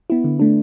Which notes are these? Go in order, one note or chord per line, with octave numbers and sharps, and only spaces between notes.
B3 E4
D3
A3 D4